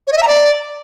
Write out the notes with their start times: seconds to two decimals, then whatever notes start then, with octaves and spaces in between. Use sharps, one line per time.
0.07 C#5
0.12 D#5
0.17 E5
0.22 A#5
0.27 D5